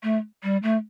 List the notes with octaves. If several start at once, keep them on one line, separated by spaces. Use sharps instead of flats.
A3
G3
A3